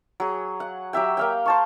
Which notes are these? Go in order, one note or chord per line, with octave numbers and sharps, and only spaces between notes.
F#3 G#4
F#5
F#3 G4 E5 G5
A#3 F5 G5
C5 A5 C#6